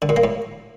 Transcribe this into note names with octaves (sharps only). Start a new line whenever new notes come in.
D3
A#2
A#3
A2